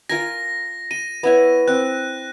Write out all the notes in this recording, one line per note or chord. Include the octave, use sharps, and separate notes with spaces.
F4 A#4 G#5 A#6
C6 D#7
B3 E4 C#5
C4 F#6